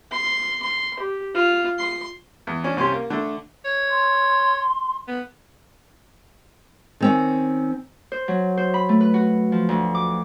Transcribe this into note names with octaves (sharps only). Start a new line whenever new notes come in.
C6
C6
G4
F4
C6
E2
C#4 D4
C2 C#4 G4 C6
A#3
D3 A3
C#5
C6
B3
D#3 C4 C#4
C5
F#3
C5
B5
A3
B4
F#4
F3
D2
D6